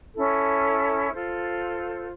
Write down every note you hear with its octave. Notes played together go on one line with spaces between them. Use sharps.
C#4 E4 A4
F4 A4 C5